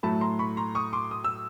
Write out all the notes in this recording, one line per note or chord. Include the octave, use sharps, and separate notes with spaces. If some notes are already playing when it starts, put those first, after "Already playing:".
A2 F#3 A3 A5 B5
A#5 C6
B5 C#6
A#5 C6
C#6 D#6
C6 D6
D#6
E6